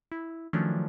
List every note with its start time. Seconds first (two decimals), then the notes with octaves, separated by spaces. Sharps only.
0.12 E4
0.53 D#3 F3 F#3 A3 C#4 D4